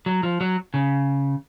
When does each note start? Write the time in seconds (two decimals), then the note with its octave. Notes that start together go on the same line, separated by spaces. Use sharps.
0.06 F#3
0.23 F3
0.41 F#3
0.74 C#3